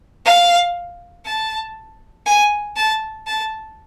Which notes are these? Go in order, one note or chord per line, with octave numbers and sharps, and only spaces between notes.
F5
A5
G#5
A5
A5